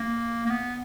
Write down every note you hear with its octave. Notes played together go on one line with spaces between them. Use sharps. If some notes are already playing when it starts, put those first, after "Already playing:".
Already playing: A#3
A#3
B3